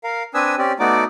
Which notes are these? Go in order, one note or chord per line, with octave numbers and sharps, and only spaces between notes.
A#4 F5
C4 D4 B4 G#5 D#6 E6
C4 C#4 G4 D5
A3 B3 D#4 F#4 D5 D6